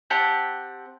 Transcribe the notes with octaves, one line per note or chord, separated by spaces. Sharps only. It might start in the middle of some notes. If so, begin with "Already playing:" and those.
C4 G4 F#5 A5